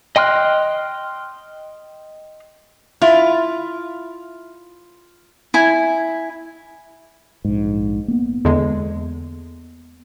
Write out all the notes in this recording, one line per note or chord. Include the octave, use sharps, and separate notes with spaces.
D#5 G5 C6 F6 F#6
E4 F4
E4 G#5
A#1 G#2
A#3 B3
E2 D3 G#3